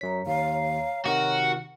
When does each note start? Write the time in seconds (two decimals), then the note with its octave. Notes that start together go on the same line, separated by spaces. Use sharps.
0.01 F#2 C#5 A#5 B6
0.26 D#2 F5
1.06 C3 D#3 F#4 A#4